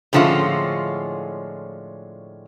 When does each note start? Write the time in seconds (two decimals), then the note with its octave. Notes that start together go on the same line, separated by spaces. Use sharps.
0.13 A2 D3 F3 G#3 C#4 F4